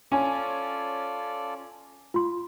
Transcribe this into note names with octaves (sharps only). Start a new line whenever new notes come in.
C#4 F4 A4 D5 G#5
F4 C6